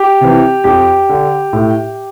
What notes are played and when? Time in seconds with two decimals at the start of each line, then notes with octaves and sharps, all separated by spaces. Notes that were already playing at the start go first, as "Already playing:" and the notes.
Already playing: G4
0.21 C3 E3
0.64 F2 G4
1.09 D3
1.53 A2